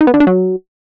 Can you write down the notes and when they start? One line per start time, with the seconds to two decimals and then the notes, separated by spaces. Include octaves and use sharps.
0.01 D#4
0.07 B3
0.14 D3
0.20 D4
0.27 F#3